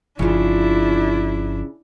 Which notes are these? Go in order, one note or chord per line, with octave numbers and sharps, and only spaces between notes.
G1 C#3 F3 D4 E4 F4